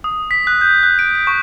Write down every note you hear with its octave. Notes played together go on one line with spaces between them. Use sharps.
D#6
B6
F#6
G6
F#6
D7
D7
C#6